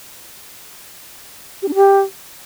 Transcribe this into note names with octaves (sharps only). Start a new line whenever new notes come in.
G4
D4
G4